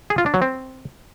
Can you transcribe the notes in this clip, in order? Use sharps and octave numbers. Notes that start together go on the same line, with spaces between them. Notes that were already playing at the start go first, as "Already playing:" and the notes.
G#4
F4
D4
F#3
C4